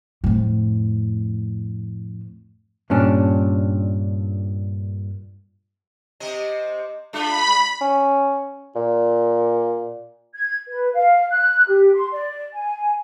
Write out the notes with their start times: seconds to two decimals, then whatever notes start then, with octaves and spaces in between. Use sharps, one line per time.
0.24 F2 A2
2.90 G2 A#2 C#4 D4
6.20 C3 C4 D#5
7.13 G#3 D4 F4 B5
7.81 C#4
8.76 A#2
10.35 G#6
10.67 B4
10.93 F5
11.30 F#6
11.67 G4
11.94 C6
12.12 D5
12.53 G#5